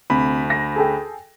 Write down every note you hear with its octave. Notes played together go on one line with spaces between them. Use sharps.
D2 C3 B5
A#6
G#4 A4 G5